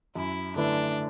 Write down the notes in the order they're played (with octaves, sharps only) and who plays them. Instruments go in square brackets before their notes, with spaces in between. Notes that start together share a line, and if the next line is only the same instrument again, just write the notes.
[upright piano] F#2 [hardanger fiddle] E4
[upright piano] D3 A3 E4 B4 [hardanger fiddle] D4